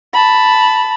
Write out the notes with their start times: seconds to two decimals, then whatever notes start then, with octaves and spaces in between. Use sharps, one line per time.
0.14 A5 B5